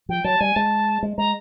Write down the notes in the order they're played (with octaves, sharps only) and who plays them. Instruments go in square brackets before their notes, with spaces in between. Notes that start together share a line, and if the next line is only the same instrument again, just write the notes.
[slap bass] F3 [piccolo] G5
[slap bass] F#3 [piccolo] A5
[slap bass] G3 [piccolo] G#5
[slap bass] G#3 [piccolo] A5
[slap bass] G#3
[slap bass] G#3 [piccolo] A#5